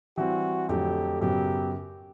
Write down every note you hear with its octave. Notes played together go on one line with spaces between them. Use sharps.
E3 G3 C4 F#4
F2 D3 F#3 A3 G4
F#2 C#3 F#3 B3 G4